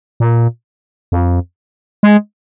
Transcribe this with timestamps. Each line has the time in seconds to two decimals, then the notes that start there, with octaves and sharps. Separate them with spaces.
0.20 A#2
1.12 F2
2.03 G#3